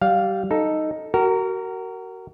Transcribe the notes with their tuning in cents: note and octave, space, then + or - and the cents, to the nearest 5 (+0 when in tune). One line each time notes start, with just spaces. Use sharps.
G3 -20 F5 +5
D#4 +0 A4 +0
F#4 +30 A#4 -15